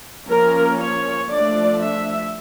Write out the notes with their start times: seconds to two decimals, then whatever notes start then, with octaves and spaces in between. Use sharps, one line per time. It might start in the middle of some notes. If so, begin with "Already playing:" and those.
0.27 F3 A#3 C#4 A#4
0.78 C#5
1.29 F3 A3 D4 D5
1.81 E5